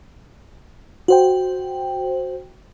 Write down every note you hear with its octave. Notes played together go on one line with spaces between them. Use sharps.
F#4 C5 G5